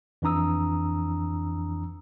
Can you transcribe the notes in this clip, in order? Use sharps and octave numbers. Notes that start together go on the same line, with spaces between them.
F2 E3 D4 A#5 D#6 E6